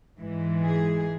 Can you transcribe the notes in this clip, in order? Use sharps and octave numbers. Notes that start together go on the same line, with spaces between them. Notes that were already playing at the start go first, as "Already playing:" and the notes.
G#2 E3 G#3
G#4